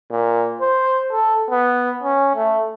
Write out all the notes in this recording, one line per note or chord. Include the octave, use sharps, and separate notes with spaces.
A#2
C5
A4
B3
C#4
A3